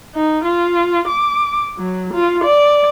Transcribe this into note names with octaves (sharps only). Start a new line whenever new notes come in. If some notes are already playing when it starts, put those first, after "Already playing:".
D#4
F4
D6
F#3
F4
D5